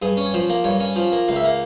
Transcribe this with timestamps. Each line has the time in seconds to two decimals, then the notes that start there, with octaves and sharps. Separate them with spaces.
0.02 G2 G#4
0.17 C#4
0.26 C#5
0.34 F3 C5
0.50 A#3
0.64 G2 C#5
0.80 C#4
0.96 F3
1.12 A#3
1.28 C#2 F5
1.36 E5
1.43 A#3 F5